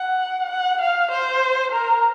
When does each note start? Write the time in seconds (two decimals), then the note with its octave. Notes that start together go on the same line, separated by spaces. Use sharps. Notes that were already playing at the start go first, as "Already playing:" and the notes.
Already playing: F#5
0.51 F#5
0.81 F5
1.11 C5
1.72 A#4